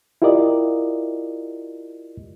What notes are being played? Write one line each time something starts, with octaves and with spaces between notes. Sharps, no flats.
E4 F4 G4 A#4 D5 D#5